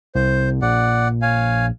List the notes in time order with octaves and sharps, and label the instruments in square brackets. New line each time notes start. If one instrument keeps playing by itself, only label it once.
[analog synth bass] C2 [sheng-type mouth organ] C5
[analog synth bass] A#1 [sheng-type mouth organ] D5 F#5
[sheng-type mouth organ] C#5 F5 G#5